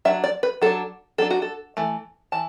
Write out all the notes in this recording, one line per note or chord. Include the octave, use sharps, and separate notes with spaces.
F#3 D4 E5
D5
B4
F#3 D4 A4
F#3 D4 A4
F#4
A4
E3 A3
E3 A5